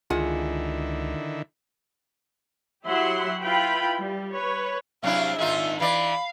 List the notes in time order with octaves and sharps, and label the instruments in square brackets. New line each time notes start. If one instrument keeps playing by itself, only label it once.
[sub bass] C#2 [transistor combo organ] D3 D#3 E4 [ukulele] F4 G#4 F#5
[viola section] F#3 E4 G4 E5 F#5 C6
E4 F4 B4 G5 B5
G3
B4 C#5
[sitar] C3 D4 E4 [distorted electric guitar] F#3 [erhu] F5
[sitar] A#2 D#4 F4 [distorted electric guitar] D#3 G#4 [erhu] E5
[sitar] E3 D5 [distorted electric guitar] F5 [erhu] B5